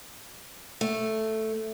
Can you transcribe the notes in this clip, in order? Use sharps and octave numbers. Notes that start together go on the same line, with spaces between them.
A3